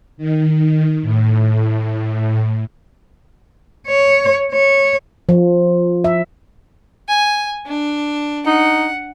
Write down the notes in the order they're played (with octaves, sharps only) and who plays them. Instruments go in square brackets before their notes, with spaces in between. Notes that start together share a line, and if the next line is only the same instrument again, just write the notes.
[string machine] D#3
A2
[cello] C#5
C#5
[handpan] F3
E5
[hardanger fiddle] G#5
D4
[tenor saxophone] D#4 [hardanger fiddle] F#5